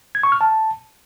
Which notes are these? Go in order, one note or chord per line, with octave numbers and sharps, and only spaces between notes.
G#6
C#6
F6
A5